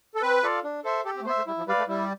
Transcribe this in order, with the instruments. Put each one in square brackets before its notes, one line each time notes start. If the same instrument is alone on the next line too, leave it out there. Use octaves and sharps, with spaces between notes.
[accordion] A4
[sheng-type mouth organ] C4 [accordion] B4
[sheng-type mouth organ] F4 A4 D5 F5
D4
A4 C5 E5
[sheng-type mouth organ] G4 [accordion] A4
[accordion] C4
A3
[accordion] B3 [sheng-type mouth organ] C5
[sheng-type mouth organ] E5
[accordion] A3
[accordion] G3 [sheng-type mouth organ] E4
[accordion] F3
[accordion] G3 [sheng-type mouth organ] B4 D5 F5
[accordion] A3
[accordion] G3 [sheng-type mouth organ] E4